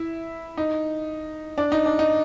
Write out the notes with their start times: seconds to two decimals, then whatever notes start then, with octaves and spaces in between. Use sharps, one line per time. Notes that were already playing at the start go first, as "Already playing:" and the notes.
Already playing: E4
0.57 D#4
1.58 D4
1.72 D#4
1.86 D4
1.99 D#4